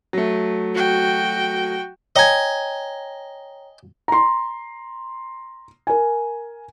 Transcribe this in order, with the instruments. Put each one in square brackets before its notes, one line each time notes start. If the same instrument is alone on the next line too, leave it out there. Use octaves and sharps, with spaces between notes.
[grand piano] F#3 A3
[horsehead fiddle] F#4 G5
[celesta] C#5 G5 A#5 [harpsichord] D#5 G#5
[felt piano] A#5 C6
A#4 G#5